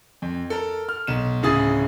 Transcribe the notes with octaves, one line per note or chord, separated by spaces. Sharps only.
F2
A4 A#4
F6
B1 E7
D1 C#3 E4 G#4 D#6 A6